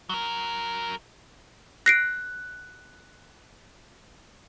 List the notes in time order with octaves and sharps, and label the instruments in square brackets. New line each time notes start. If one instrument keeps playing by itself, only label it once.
[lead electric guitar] F#3 A#4
[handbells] F#6 [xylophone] A#6 C7 D7